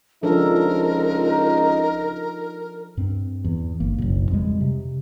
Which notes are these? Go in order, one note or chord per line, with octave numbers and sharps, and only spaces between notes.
C#2 F3 D4 D#4 A4 A#4
G2 C4
E2
G1 A#3
F#1 B1
F2 G3 G#3
C3